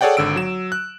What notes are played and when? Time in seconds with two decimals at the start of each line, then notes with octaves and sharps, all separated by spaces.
0.01 G#4 A4 C#5 D5 F#5 G5
0.17 G#1 D3 E6 D7
0.36 F#3 E7
0.72 F#6